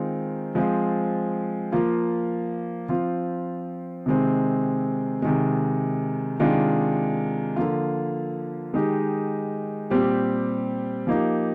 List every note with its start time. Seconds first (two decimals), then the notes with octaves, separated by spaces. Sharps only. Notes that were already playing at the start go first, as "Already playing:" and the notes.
Already playing: D#3 G#3 C4 F4
0.55 F3 G#3 C4 F4
1.72 F3 A#3 F4
2.89 F3 C4 F4
4.06 C3 D#3 G#3 C4
5.22 C3 D#3 G#3
6.39 C3 D#3 G#3 D4 F4
7.56 D3 F3 A#3 F4
8.73 D#3 G#3 D#4 G4
9.90 A#2 G3 C4 G4
11.07 F3 A#3 D#4 G4